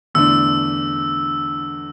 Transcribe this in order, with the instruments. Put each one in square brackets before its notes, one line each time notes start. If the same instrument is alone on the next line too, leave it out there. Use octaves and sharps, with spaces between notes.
[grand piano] E2 D3 A3 D4 [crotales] E6